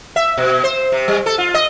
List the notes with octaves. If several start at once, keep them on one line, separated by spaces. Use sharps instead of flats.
E5
B2
C5
C3
G3
A4
F4
D#5